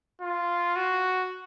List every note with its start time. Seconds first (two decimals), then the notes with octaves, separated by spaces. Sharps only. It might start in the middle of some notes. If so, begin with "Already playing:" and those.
0.21 F4
0.76 F#4